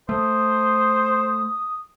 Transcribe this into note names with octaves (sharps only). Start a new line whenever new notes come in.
A3 C5 D#6